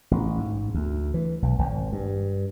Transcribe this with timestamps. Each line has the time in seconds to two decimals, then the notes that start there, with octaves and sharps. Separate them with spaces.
0.11 A1
0.38 G#2
0.74 D2
1.14 E3
1.42 B1
1.59 G#1
1.93 G2